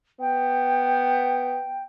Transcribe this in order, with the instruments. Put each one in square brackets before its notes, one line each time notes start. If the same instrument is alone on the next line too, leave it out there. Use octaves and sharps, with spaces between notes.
[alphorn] B3 [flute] G5